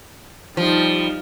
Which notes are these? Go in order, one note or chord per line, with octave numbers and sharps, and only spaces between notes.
F3 G3 D#4